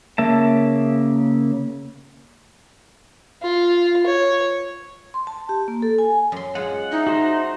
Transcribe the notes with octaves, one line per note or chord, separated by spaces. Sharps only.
C#3 A#3 E5 A5
F4
C#5
C6
A5
G4
A#3
A4
G#5
F#2 C6
G#3 F4 G#4 F#5
D#4 E4 E5
F#4 C5 A#5